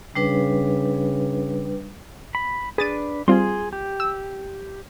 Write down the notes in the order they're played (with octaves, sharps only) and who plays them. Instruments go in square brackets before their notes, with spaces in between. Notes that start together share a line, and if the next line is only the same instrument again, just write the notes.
[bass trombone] C#3 [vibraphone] G3 D4 B4
[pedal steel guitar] B5
[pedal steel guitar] D4 B4 [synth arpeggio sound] G#4 A6 D#7
[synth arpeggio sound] G3 C4 F4 [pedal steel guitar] G#4 C6
[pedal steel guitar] G4
[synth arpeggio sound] E6